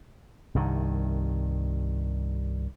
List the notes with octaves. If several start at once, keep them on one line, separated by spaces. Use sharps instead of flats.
C2 G2 D#3